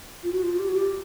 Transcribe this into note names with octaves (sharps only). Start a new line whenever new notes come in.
F4
F#4
F4
G4
F#4
G4